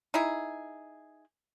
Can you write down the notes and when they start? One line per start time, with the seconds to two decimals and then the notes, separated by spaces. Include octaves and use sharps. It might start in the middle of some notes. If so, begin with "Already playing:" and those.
0.14 D#4 E4 G#4